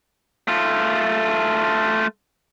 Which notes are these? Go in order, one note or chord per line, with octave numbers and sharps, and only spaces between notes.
A3 F4